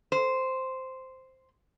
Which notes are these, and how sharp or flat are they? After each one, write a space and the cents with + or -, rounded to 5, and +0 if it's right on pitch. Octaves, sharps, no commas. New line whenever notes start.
C5 -5